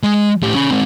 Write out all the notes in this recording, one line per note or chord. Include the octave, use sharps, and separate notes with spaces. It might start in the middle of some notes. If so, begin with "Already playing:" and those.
G#3
A2 G4
C#4 B5
G#3 C4